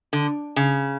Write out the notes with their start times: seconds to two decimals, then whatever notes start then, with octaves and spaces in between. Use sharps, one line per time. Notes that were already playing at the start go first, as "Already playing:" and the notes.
0.13 D3
0.56 C#3